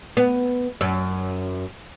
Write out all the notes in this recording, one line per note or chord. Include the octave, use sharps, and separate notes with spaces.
B3
F#2